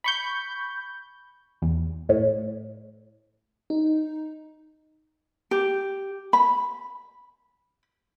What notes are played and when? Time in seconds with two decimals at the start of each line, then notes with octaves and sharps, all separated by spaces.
0.04 B5 C#6 G6
1.62 E2
2.09 A2
3.70 D#4
5.51 G4
6.33 B5